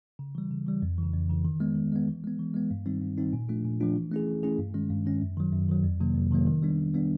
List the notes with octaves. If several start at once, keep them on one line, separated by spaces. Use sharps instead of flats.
C#3
E3 G3
C#3
E3 G3
F2
C#3 E3
F2
C#3 E3
D#3
G#3 B3
D#3
G#3 B3
E3
G#3 B3
E3
G#3 B3
G2
D#3 G3 C4 D#4
G2
D#3 G3 C4 D#4
A#2
F3 A3 D4 F4
A#2
F3 A3 D4 F4
E3
A3 C#4 E4 G#4
E3
A3 C#4 E4 G#4
G2
D#3 G#3 C#4
G2
D#3 G#3 C#4
F#2
D#3 F#3
F#2
D#3 F#3
F2
C3 D#3 F#3 A#3
F2
C3 D#3 F#3 A#3
D#3
G3 B3 D4
D#3
G3 B3 D4